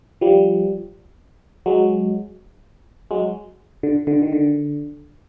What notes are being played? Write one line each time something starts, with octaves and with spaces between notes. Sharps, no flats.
F3 G3
F#3 G#3
F#3 G#3
D3
D3
D#3
D3